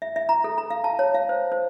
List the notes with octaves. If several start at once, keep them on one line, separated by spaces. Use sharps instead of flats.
E5
E5
A#5
A4
A#5
F5
A5
C#5
F5
C5
C5